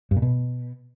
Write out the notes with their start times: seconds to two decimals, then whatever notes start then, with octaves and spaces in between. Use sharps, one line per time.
0.11 G2
0.17 A#2
0.22 B2